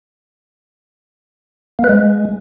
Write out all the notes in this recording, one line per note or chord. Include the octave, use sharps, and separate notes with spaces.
A#3
B4
G#3